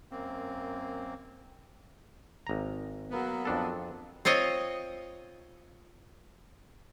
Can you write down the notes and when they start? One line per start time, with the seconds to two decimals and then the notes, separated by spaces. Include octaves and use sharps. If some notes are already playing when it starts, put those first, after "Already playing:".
0.11 F#2 A#3 C4
2.47 G#1 A#5
3.11 F#3 A#3 B3
3.45 F2 D4 A4
4.25 C4 F4 C#5 D#5